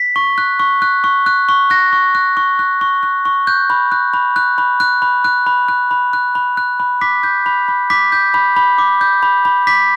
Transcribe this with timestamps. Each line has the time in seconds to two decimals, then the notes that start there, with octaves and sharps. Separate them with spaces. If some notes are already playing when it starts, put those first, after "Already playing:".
Already playing: B6
0.16 C#6
0.38 F#6
0.59 C#6
0.82 F#6
1.04 C#6
1.26 F#6
1.49 C#6
1.70 F#6 A#6
1.93 C#6
2.15 F#6
2.37 C#6
2.59 F#6
2.81 C#6
3.03 F#6
3.25 C#6
3.47 F#6 G6
3.70 B5
3.92 F#6
4.14 B5
4.36 F#6
4.58 B5
4.80 F#6
5.02 B5
5.24 F#6
5.46 B5
5.68 F#6
5.91 B5
6.13 F#6
6.35 B5
6.57 F#6
6.80 B5
7.01 D6 B6
7.23 G6
7.46 B5
7.68 B5
7.90 D6 B6
8.12 G6
8.34 B5
8.56 B5
8.78 D6
9.01 G6
9.23 B5
9.45 B5
9.67 D6 B6